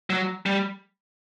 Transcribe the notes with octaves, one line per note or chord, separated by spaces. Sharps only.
F#3
G3